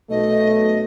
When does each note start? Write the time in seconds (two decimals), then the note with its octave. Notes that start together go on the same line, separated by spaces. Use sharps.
0.10 B1 A3 D#5